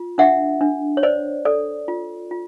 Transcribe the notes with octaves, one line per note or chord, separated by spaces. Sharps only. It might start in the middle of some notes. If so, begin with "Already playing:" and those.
Already playing: F4
D4 E5 F#5
D4
C#5
C5 D5
A4 D5
F4
F4